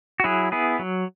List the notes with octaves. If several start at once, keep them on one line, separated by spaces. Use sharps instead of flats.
F#4
F#3 E4 G#4
B3 E4 G#4
F#3